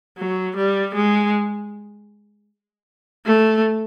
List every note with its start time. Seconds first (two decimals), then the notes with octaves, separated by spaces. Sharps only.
0.18 F#3
0.56 G3
0.95 G#3
3.26 A3